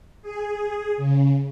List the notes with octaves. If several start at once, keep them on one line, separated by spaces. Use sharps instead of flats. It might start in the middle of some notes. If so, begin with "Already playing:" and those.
G#4
C#3